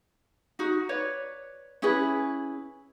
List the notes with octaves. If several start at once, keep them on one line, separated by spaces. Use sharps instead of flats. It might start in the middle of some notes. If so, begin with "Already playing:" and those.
D#4 F#4
B4 C#5 D5
C#4 E4 G#4 B4